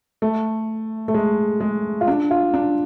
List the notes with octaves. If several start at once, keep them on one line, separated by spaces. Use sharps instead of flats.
A3
A3
G#3
G#3
F4
D4
F4
D4